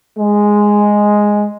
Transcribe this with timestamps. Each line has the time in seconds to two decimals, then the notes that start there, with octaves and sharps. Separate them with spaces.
0.18 G#3